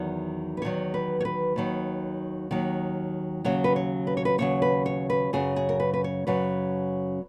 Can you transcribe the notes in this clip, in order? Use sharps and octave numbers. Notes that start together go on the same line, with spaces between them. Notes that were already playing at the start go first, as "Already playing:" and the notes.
Already playing: E2 D#3 F#3
B4
E2 D#3 F#3 C#5
B4
C#5
B4
D#2 D#3 F#3
D#2 D#3 F#3
D#2 C#3 F#3 C#5
B4
C#5
B4
C#5
B4
D#2 C#3 F#3 C#5
B4
C#5
B4
F#2 C#3 F#3 G#4
G#4
A#4
B4
B4
C#5
F#2 C#3 F#3 B4